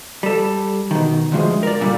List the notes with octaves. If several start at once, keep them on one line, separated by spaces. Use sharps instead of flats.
G3 A4
B2 D#3
D2 G2 F3 G#3
A#4 D5
A#2 D3 G3